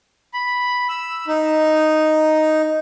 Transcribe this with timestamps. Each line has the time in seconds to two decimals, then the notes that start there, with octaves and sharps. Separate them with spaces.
0.34 B5
0.89 E6
1.27 D#4